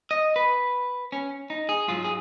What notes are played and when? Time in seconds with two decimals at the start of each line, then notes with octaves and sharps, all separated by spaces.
0.11 D#5
0.36 B4
1.12 C#4
1.50 D#4
1.69 G#4
1.88 G#2 F#3 F4
2.04 G#4